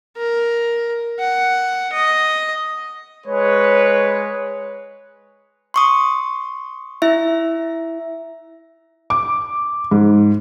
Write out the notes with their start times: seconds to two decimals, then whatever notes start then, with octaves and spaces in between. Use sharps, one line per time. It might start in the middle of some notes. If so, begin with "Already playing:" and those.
0.17 A#4
1.19 F#5
1.93 D#5
3.27 G#3 B4 C#5
5.74 C6 C#6 D#6
7.02 E4 E5
9.10 D6
9.91 G#2